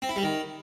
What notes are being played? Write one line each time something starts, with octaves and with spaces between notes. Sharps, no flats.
C4
E4
G3
D#3